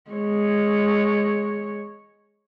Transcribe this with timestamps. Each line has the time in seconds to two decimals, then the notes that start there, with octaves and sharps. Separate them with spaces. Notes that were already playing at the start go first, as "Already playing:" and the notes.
0.11 G#3 C#5